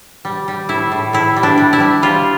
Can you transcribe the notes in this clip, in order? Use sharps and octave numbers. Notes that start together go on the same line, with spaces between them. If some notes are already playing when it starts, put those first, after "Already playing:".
G3
G3
A2 E4
A2
A2 E4
G3
D4
G3
E4
G3
G3 F4